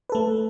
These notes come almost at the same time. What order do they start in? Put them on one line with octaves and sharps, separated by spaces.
B4 A4 A3